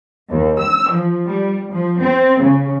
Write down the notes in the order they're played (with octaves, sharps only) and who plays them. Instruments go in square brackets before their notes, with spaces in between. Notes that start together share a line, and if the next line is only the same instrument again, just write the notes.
[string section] D#2
E6
F3
G3
F3
C4
C#3